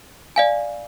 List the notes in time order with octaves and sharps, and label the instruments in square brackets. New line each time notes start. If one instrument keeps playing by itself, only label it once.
[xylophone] D5 F5 G#5